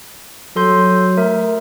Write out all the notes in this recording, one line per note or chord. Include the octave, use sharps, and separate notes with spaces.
F#3 A4 C6 G6
A3 A#4